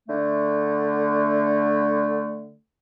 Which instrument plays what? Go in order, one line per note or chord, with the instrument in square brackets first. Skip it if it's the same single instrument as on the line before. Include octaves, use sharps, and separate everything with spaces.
[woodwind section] D3 A3